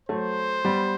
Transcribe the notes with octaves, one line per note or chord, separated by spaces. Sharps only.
F#3 A3 C5
G3 B3